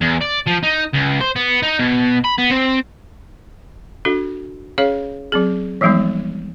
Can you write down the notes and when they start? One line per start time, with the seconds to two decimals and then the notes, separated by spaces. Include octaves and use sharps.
0.02 E2
0.21 D5
0.47 F3
0.63 D#4
0.94 C#2
1.21 C5
1.36 B3
1.63 D#4
1.79 B2
2.24 B5
2.38 B3
2.51 C4
4.05 D4 F#4 A4
4.78 C#4 G#4 C#5 F5
5.32 F#3 C4 G#4
5.81 E3 F3 G3 G#3 B3 D#4